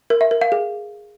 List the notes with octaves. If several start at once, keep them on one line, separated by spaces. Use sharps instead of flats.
A#4
E5
A#4
F5
G#4